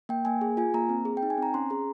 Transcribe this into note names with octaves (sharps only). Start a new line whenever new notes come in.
A#3 G5
A#3 G#5
G#4
F4 G#5
A#3 A#5
C4
G#4
G5
D#4
G#5
C4 A#5
C#4 C6
G#4 A#5